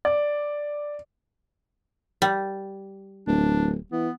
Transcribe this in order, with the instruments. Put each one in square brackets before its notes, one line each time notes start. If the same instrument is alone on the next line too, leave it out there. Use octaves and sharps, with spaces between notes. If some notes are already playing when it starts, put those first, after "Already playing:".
[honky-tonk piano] D5
[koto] G3
[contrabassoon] D1 [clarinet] D4
[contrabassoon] E3 [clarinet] B3